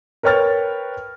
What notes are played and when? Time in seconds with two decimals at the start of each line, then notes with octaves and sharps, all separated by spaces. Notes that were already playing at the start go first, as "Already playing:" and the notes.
0.23 A#4 B4 C#5 G5 F6 A6